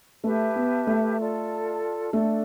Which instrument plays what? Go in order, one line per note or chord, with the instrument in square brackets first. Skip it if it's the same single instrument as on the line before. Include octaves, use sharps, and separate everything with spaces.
[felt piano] A3 [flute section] G4 B4 E5 A5
[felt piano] B3
A3
[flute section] F4 A4 D5 A5
[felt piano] A3 [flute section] D4 A4 D5